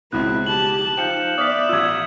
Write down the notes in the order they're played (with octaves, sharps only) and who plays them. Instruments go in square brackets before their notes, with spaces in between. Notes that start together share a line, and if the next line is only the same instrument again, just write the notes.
[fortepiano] C#2 B2 [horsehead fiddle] C4 E4 [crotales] F#6
[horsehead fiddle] G4 A5 [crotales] F#7
[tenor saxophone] F3 [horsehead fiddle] D#4 [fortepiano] G5 [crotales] G6 C#7 E7
[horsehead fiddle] B3 E5 [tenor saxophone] D5 [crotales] D#6 F6 B6
[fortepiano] A1 F4 [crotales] E6 G#6